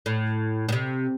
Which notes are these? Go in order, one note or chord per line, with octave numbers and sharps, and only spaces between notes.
A2
A2
C3